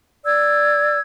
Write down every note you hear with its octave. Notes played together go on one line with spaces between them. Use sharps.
D5 E6 G#6